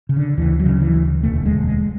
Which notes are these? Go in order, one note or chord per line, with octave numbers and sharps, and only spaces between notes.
C#3
D3
D2 E3
F#3
C#3
E3
D2
E1 A3
G#3
E1
G#3